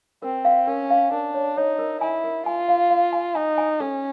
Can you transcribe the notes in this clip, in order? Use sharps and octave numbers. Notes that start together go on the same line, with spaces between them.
C4 A#4
F5
C#4 A#4
F5
D4 A#4
C#5
D#4 C#5
A#4
E4 G#5
A#4
F4 G#5
F5
F5
G#5
D#4 G#5
G#5
C#4 A4